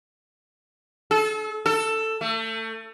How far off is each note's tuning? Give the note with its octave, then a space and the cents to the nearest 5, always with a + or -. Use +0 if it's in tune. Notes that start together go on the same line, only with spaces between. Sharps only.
A4 -35
A4 +10
A3 +30